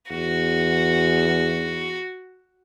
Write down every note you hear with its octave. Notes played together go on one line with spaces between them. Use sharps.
E2 F#4